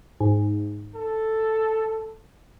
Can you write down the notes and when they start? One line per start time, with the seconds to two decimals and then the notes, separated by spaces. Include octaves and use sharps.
0.21 G#2
0.95 A4